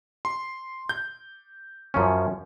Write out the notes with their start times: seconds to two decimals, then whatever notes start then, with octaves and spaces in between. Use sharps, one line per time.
0.25 C6
0.89 G6
1.94 F#2 F3 C#4